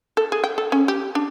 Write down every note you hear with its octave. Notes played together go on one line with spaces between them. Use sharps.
A4
G#4
G5
A4
C#4
G4
D4